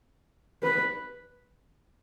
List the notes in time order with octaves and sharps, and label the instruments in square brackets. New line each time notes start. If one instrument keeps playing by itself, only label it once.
[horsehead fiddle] B4